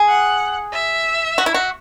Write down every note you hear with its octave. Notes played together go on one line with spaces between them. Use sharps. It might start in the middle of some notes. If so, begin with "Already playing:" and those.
Already playing: G#4
F#5
E5
F#4
E4
F#4